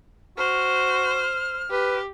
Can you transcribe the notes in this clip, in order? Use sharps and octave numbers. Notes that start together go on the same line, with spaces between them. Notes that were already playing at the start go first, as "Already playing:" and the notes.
F#4 C5 F6
G4 B4